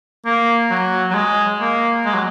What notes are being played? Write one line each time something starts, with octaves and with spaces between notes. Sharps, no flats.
A#3
F#3
F#3
G#3
A#3
G#3
F#3